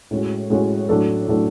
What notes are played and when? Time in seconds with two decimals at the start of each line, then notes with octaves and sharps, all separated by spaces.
0.11 A2 G#3 C#4 F#4
0.50 A2 G#3 C#4 F#4
0.89 A2 F#3 A3 D4 A4
1.28 A2 F#3 A3 D4 A4